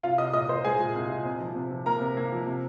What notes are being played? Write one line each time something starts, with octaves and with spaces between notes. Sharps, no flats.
C2 F4 F5
C2 D#5 D#6
A#2 D#5 D#6
A#2 C5 C6
G#3 G#4 G#5
A#2
C2
A#2
C3
F3
C3
F3
A#3 A#4 A#5
C3
A#3
F3
C3